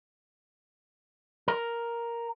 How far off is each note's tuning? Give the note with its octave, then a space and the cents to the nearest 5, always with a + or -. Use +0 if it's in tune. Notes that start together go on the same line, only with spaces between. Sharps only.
A#4 +5